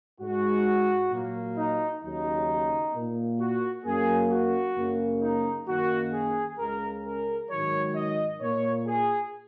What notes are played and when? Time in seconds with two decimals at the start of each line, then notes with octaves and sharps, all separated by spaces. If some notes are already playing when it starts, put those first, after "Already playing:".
0.20 G#2 G#3 F#4
1.11 A#2 F#3 A#3
1.57 D#4
2.03 D#2 C#3 F#3 D#4
2.94 A#2 A#3
3.39 F#4
3.85 F#2 F#3 A#3 G#4
4.31 F#4
4.76 F#2 C#3 A#3
5.22 D#4
5.68 F#2 D#3 A#3 F#4
6.13 G#4
6.59 C#2 C#3 G#3 A#4
7.05 A#4
7.50 G#2 D#3 F#3 C#5
7.96 D#5
8.41 A#2 A#3 C#5
8.87 G#4